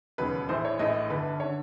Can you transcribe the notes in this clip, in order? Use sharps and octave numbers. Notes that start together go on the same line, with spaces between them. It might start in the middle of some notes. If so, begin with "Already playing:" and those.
E1 D#2 C#3 F#3 B4
A#1 A2 E3 A3 C5
C#5
A#1 A2 E3 A3 D#5
G1 G2 D3 B4
D3 C#5